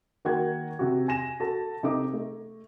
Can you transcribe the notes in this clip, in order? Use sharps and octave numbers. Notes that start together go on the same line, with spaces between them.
D#3 A#3 F#4 F#5 G5 G#6
C3 F#4
G#5 A#6 E7
F#4 A4 A5
C3 D#4 A4 E5 D6
A3